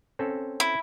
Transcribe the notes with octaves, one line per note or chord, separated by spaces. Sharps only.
C4 C#4 A4
E4